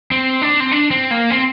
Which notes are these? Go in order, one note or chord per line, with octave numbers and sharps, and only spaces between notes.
C4
D4
C4
D4
C4
A#3
C4